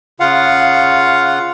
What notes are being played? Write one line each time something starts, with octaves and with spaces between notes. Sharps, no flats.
C#3 F4 F5 F#5